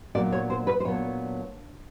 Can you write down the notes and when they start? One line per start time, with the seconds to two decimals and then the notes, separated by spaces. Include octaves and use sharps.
0.15 A#2 F#3 B3 D4 D5
0.33 C#5
0.50 C5
0.67 B4
0.80 C5
0.84 A#2 F#3 B3 D4 C#5